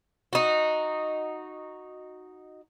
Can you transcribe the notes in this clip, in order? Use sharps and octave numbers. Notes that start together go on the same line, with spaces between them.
D#4 F#4